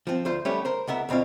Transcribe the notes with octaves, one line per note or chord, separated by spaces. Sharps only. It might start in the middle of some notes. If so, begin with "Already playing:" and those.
F3 C4
D2 F4 C5
G3 A3 B3 C#4 G4 B4
A#4 C5
C#2 B3 A#4 E5
D2 B2 C4 F4 F5